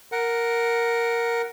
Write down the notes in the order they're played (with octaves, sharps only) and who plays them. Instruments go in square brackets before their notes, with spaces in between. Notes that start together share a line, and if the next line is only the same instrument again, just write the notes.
[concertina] A#4 F#5